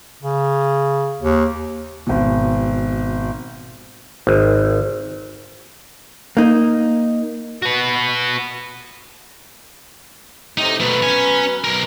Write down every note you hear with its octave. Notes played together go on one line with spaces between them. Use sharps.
C#3
D#2
G#1 B2
G#1
A#3 D#4
F#4 B4
A2 C3 D#4
B2 F#3 A3 B3 B4
C#4 G#5
B1 A#4